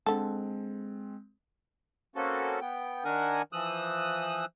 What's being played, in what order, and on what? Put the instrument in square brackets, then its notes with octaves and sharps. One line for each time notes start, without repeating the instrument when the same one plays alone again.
[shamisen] D3 A4 [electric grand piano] G#3 C4
[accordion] A#3 C4 C#4 F#4 A4
B3 G5
D#3 D4 A#4 F#5 G#5
E3 F3 D#6 E6 F#6